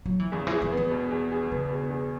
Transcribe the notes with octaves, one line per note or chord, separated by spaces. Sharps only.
F#3
E3
E2 C#3
E3 G#4
E3
E3 B3
B2
E2
G#4
C#3 B3
B2
E2